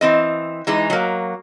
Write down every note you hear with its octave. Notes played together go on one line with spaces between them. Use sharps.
E3 C4 D#5
E3 G#3 D#4
F#3 A#3